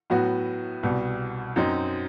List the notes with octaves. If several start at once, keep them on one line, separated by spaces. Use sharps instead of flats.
A2 F#3 B3 F#4
C2 B2 G3
F#2 F#3 C4 D#4